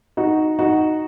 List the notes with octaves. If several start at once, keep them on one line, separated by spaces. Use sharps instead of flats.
D#4 F#4
D#4 F#4